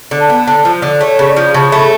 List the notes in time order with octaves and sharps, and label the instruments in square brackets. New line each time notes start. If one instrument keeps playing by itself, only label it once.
[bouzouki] D3
[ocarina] A5
[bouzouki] B3
[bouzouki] D3 [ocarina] A5
[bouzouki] F3
D3
[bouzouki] A3 [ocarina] C#5
[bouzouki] C#3
[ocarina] D5
[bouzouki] F3
[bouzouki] C#3 [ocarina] A5
[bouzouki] A3 [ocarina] B5